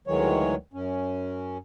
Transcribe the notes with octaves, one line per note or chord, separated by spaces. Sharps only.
D2 D#3 E3 F#3 G#3 C#5
F#2 C#4